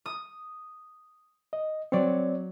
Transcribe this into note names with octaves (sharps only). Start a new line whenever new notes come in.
D#6
D#5
F#3 C4 C#5 D5 C#7